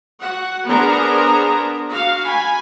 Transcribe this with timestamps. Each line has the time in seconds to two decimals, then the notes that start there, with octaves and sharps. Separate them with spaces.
0.24 F#4 F#5
0.66 B3 D4 G#4 A#4 C5 A#5
1.90 F#4 F5
2.26 G#5 B5